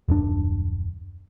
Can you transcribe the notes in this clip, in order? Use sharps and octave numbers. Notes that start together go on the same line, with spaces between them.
D#1 F#2 D4